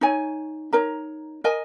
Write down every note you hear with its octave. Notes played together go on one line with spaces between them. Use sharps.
D#4 C#5 G#5
D#4 A#4 C#5 A#5
A#4 D#5 G#5